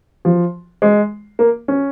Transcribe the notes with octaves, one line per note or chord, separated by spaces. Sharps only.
F3
G#3
A#3
C#4